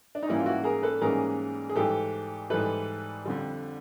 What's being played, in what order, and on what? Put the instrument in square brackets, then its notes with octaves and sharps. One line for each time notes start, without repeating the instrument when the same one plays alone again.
[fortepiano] D4
D#4
G#2 E3 G3 A#3 C#4 E4
F4
E4 F#4
G#4 A#4
A4 B4
G#2 E3 G3 A#3 C#4 G#4 A#4
G#4
G#2 E3 G3 G4 A4
G#2 E3 G3 A4 B4
F2 D3 G3